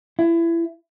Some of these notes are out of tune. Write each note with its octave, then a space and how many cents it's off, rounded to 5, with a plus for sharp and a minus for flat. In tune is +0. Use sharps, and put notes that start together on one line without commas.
E4 +25